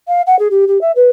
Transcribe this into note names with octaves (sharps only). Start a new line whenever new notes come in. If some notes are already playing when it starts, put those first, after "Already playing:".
F5
F#5
G#4
G4
G4
E5
B4